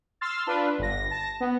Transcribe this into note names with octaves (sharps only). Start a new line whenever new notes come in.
C6 E6 F6 A6
D4 F4 B4
G1 A#6
A5 A#6
B3